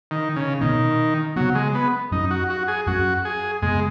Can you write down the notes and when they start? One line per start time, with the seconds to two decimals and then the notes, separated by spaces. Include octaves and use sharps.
0.11 D#3
0.36 C#3
0.61 B2 D#3 B3
1.36 C#3 F#3 B3
1.55 G#3
1.75 B3
2.11 F#2 F#3 C#4 D#4
2.31 F#4
2.50 F#4
2.68 G#4
2.86 F#2 F#3 C#4 F#4
3.25 G#4
3.62 F#2 C#3 G#3 B3